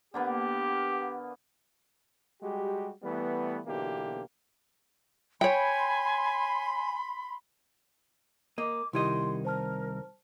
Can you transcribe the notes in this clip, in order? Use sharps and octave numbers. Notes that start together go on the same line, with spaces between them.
D3 A#3 B3 G4
G3 G#3 F#4 G4
E3 G3 A3 B3
B1 B2 D3 E3 A#3 G4
C#5 G5 G#5 B5 C6
A#3 D#5 D6
C2 D#3 E4 G4 D#5 C6 G#6
A#4 C5 A5 F6